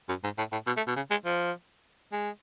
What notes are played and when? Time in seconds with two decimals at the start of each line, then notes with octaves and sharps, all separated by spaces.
0.09 F#2
0.24 G#2
0.38 A2
0.52 A2
0.67 B2
0.77 A3
0.87 B2
0.96 C#3
1.11 G#3
1.25 F3
2.12 G#3